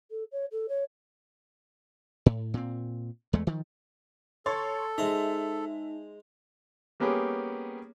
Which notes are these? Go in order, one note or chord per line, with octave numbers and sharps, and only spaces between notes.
A4
C#5
A4
C#5
A2
A#2 C4
E2 G#3 A3
D#3 F3
A4 C#5 C6 A6
G#3 D#4 C5 E5 A#5
G3 A#3 B3 C#4 G4 G#4